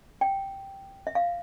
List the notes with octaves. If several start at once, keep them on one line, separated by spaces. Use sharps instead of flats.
G5
E5
F5